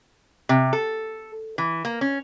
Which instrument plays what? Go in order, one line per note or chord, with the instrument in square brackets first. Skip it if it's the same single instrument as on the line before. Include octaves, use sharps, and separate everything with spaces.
[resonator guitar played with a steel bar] C3
A4
E3
A#3
C#4